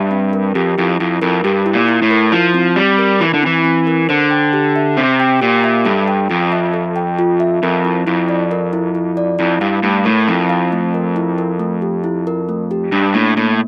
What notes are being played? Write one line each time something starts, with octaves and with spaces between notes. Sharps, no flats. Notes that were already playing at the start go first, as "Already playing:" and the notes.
Already playing: G2 E5
C4
A#4
F2 G4
F2 E4
F2 E4
F2 A#4
G2 G4
E4
A#2
E4
A2
A#4
F3 E4
C4
G3 C4
A#4
E3 E4
D3
E3 C4
C4
A#4
D3 C5
G5
G4
E5
C3 C5
G5
A#2 G4
E5
G2 A4
G5
F2 F4
E5
A4
G5
F4
E5
F2 A#4
E4
F2 E4
D5
A#4
E4
E4
D5
F2 E4
G2 F5
G2 A3
A2 A#4
F2 E4
F5
A3
A#4
E4
A#4
A3
G4
E4
A#4
A3
G4
G2 D4
A2 A#3
A2 A#3